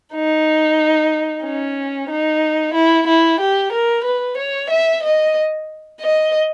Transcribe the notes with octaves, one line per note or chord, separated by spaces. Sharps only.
D#4
C#4
D#4
E4
E4
G4
A#4
B4
C#5
E5
D#5
D#5